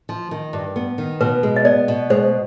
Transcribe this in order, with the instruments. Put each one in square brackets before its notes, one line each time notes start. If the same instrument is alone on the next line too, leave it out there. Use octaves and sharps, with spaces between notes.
[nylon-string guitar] F3
D#3
G2
B3
D#3
[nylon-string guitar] B2 [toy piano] B4
[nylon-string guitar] G#3
[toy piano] D#5
[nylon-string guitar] B3 [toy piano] D5
[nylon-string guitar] B2
[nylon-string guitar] G#3 [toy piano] C5